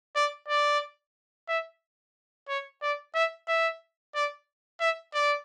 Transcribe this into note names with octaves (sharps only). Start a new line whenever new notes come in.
D5
D5
E5
C#5
D5
E5
E5
D5
E5
D5